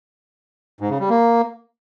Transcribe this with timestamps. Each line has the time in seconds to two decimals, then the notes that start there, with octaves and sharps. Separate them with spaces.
0.81 G#2
0.90 C#3
1.00 G3
1.10 A#3